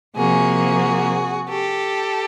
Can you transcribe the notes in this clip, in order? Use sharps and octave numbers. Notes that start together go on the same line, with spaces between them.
C3 F3 A#3 F#4 G#4
G4 A4